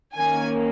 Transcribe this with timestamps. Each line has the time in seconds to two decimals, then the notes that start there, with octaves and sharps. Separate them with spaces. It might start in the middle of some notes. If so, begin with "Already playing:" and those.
0.15 D#3 A#3 C#4 G#5